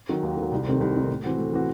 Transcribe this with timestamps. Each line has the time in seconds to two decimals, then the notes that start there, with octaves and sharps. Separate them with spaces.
0.09 D#3 F#3
0.23 D#2
0.37 D#3
0.42 F#3
0.52 C2
0.66 C3 D#3 A3 C4
0.81 C2
0.96 C3 D#3 A3 C4
1.09 A2
1.23 E3 C4 F#4
1.38 A2
1.52 E3 C4 F#4